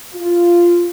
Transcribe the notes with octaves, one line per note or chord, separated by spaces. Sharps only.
F4